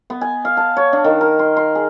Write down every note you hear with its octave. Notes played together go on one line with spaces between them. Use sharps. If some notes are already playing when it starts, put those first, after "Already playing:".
B3
G#5
F5
A5
C#5
D4
D#3
A#4
C6
C6
G#4